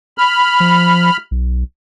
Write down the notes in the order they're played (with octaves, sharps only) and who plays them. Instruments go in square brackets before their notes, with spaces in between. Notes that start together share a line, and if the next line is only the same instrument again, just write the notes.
[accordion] B5 F6
[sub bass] F3
B1